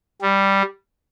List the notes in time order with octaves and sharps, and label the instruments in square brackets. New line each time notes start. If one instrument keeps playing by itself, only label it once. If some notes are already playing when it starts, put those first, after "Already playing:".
[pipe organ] G3